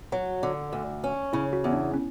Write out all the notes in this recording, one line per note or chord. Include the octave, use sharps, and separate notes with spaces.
F#3 F#4
D3
D2
C#4
C#3 E4
F#4
E2
D4
C#4